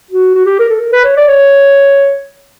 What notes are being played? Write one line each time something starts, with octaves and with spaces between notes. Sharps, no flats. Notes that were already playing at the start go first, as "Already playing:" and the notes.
F#4
F#4
G4
A#4
A4
A#4
B4
C#5
D5
C#5